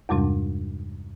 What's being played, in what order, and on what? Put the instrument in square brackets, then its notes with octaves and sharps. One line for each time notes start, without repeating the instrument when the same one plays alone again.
[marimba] E2 G2 C3 G3 G#3 D4